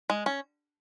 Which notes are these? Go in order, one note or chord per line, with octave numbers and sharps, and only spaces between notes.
G#3
C#4